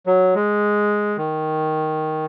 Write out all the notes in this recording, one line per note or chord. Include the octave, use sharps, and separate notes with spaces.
F#3
G#3
D#3